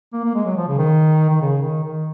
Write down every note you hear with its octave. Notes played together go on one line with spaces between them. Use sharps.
A#3
A#3
G#3
F#3
F3
C#3
D#3
D#3
C#3
D#3
D#3